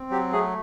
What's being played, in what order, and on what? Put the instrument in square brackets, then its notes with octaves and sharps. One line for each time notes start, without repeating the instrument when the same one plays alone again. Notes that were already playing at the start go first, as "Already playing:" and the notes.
Already playing: [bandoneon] C4
F#3 G4
A3 G#4